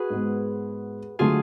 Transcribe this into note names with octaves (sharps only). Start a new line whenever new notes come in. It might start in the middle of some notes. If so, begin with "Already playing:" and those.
Already playing: F#4 G#4 B4
G#2 G#3 B3
D3 F#3 A3 F4 G#4